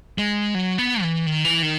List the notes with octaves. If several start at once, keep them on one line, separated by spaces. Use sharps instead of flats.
G#3
F#3
B3
E3
D#3
E3
D#3